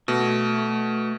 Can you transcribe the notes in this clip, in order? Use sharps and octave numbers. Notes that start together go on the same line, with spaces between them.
B2 A3